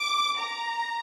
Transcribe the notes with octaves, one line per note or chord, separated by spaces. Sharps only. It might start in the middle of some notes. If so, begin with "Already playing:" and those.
Already playing: D6
A#5